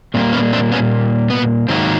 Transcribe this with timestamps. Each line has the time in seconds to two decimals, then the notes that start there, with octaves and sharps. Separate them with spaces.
0.14 A#2 G3 A#3 C4
0.33 B3 C#4
0.53 C4 D4
0.72 B3 C#4
1.30 B3
1.68 G#2 D#3 F#3 A#3 C4